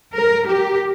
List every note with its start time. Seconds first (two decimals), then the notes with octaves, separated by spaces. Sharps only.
0.14 A#4
0.48 G4